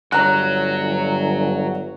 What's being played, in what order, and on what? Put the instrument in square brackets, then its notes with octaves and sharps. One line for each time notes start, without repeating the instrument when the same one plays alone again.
[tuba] G1 [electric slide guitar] F#3 [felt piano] C#5 A#5 F#6